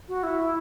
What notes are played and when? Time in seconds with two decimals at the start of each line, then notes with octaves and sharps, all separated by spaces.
0.09 F#4
0.23 E4